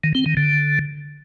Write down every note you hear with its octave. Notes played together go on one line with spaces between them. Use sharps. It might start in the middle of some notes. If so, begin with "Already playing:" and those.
D#3
C4
D#3
D3